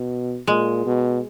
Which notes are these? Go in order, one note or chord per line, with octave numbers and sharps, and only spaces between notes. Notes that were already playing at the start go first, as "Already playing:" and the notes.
Already playing: B2
A#2 G#3
B2